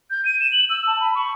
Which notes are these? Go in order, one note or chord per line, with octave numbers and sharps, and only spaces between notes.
G6
D#7
E7
F#7
E6
A5
B5
C#6